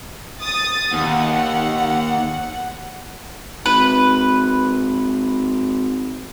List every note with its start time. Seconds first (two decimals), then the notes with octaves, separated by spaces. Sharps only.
0.39 D#6 A6
0.93 D#2 F#5
3.66 G#1 B4